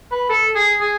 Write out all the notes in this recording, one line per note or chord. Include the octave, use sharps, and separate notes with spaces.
B4
A4
G#4
G#4